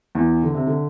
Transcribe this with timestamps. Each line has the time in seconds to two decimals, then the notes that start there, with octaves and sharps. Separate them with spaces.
0.15 E2 E3
0.43 D3
0.54 C3
0.67 D3